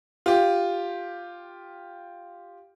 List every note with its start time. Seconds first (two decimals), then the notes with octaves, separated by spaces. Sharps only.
0.26 F4 G4